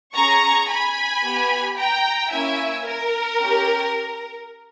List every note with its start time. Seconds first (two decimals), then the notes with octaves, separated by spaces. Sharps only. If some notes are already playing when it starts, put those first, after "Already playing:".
0.14 C#4 G#4 A#5 C#6
0.68 G#5 B5
1.23 B3 G4
1.77 G5 A#5
2.31 A#3 C#4 E4 E5 G#5
2.85 A#4
3.39 C#4 G4